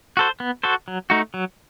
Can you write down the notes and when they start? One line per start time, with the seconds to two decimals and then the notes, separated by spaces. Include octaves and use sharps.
0.17 F#4 A4 C5
0.40 B3
0.63 F#4 A4 C5
0.88 F#3
1.10 A3 D#4 F#4
1.34 F#3